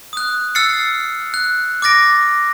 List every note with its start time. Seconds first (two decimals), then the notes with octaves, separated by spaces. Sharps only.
0.13 D#6 F#6
0.55 E6 F6 A6 C7 C#7
1.34 F#6
1.82 D6 F6 A6 A#6 D7